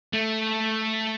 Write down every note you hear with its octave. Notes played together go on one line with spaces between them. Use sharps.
A3